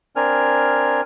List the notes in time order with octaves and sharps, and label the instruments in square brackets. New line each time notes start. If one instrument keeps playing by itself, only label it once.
[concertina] C4 D4 A#4 G#5 F6